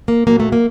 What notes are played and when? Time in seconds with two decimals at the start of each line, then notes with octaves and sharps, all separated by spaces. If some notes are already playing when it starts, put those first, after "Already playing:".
0.08 A#3
0.27 A#2 F#3 A#3
0.40 A3
0.52 A#3